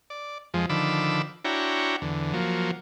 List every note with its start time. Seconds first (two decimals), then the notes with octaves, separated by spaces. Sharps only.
0.10 D5
0.54 F2 F3 G#3
0.70 D3 D#3 F3 B5 D6 E6
1.45 D4 E4 F#4 C#5 G5 A#5
2.02 E2 D3
2.33 F3 F#3 A#3